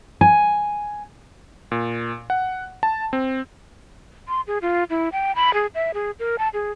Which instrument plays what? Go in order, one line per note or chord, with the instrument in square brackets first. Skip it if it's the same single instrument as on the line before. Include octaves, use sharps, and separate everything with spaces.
[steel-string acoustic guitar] G#5
[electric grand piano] A#2
F#5
A5
C4
[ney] C6
G#4
F4
E4
G5
B5
G#4
E5
G#4
A#4
A5
G#4